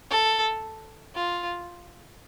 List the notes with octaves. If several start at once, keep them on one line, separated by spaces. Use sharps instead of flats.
A4
F4